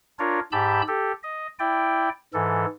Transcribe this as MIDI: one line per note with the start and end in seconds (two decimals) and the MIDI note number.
0.19 0.40 62
0.19 0.40 65
0.19 0.40 70
0.19 0.40 73
0.52 0.82 44
0.52 0.82 67
0.52 0.82 81
0.52 0.82 83
0.52 0.82 88
0.52 0.82 91
0.88 1.12 67
0.88 1.12 69
1.23 1.47 75
1.59 2.09 64
1.59 2.09 74
1.59 2.09 79
2.34 2.66 44
2.34 2.66 52
2.34 2.66 69